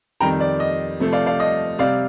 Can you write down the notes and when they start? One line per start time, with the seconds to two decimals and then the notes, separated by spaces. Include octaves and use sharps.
0.21 F2 D#3 G3 G5 A#5
0.40 D5
0.60 D#5
1.00 C3 F3 A3
1.13 D5 F5
1.26 D5 F5
1.40 D#5
1.78 C3 G3 D5 F5